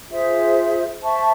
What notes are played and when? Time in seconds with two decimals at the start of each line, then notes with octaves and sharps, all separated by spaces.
0.11 F4 G#4 C5 E5
1.03 C5 E5 A5 C#6